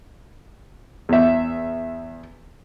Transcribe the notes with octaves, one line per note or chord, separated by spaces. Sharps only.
E2 E5